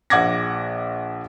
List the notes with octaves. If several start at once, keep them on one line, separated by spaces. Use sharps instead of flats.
A#1 F#5 D6 G#6 A#6